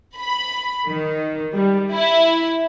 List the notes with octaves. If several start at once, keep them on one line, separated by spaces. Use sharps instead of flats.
B5
D#3
G3
E4